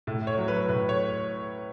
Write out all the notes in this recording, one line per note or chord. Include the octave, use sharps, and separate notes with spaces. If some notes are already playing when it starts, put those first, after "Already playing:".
A2
C#5
F#3
B4
A2 B4
C#5